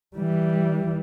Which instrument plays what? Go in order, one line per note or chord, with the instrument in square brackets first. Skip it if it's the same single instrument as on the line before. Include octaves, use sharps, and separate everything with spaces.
[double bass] E3 G3